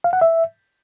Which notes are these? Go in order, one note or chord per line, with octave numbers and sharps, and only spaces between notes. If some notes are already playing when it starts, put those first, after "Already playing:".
F5
F#5
E5